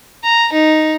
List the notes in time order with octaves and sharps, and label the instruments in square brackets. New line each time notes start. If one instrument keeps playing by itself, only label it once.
[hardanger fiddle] A#5
D#4